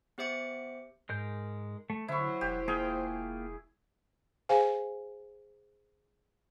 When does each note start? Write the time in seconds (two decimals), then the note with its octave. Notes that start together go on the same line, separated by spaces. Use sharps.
0.18 B3 G4 C5 E5 D6 C#7
1.09 G#2 G#3 A#4 G6
1.90 A3
2.08 D3 F#3 E4 C5 C#6
2.41 E1 G4
2.68 A#3 F4 G#4 G5
4.49 G#4 C5 F5 G#5